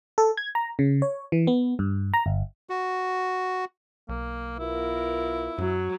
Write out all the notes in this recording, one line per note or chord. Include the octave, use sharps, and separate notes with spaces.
A4
G#6
A#5
C#3
C#5
E3
B3
G2
A#5
G1
F#4
B1 A#3
B3 E4 F4 A#4
F#2 F#3